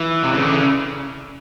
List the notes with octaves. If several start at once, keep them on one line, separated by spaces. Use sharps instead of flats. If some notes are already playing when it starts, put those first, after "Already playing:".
Already playing: E3
C3
C#3
D3
C#3